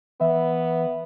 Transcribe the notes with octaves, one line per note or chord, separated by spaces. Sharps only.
E3 B3 E5